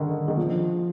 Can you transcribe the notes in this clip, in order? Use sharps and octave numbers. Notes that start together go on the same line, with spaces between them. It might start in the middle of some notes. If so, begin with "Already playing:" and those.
Already playing: D3 D#3
D#3
F3